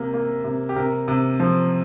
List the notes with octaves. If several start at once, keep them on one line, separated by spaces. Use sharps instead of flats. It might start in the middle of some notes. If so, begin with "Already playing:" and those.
Already playing: C3 A#3
A#3
C3
G4
C3 A#4
C3
F3